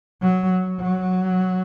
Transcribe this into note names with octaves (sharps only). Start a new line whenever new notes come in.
F#3
F#3